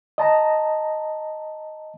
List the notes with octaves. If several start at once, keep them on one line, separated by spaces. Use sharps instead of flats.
D#5 A5 A#5